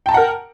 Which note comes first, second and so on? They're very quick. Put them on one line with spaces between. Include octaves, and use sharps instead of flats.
G5 A5 A#5 F#5 A#4